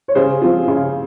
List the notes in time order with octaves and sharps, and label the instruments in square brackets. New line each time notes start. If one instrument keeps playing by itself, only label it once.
[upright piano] C#5
C#3 G#4 C5
F3 C4 F4
C#3